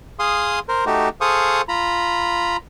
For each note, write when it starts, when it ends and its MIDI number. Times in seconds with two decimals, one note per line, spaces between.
0.19 0.59 68
0.19 0.59 77
0.19 0.59 84
0.19 0.59 87
0.69 0.85 70
0.69 0.85 72
0.86 1.09 57
0.86 1.09 63
0.86 1.09 66
0.86 1.09 67
1.21 1.62 68
1.21 1.62 69
1.21 1.62 72
1.21 1.62 77
1.21 1.62 85
1.21 1.62 87
1.68 2.57 65
1.68 2.57 82
1.68 2.57 83